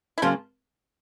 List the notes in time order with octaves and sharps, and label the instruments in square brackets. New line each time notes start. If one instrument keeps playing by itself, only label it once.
[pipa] E4
[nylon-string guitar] C#3 F#3 A#3 C#4 [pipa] F3 F4